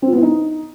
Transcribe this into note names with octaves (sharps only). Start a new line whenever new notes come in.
C4
F4
B3
E4
D#4